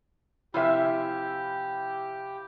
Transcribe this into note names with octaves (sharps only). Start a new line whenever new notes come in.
C3 F3 E4 G4 E5 F5 G#5